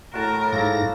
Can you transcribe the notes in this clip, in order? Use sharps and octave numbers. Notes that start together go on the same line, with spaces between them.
A2 F#4 A#4 A5
G#2 A#3 A5 E6 A#6